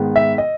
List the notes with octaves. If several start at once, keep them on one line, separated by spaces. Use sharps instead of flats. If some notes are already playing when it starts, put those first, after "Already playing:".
Already playing: G#2 D#3 G#3 B3
E5
D#5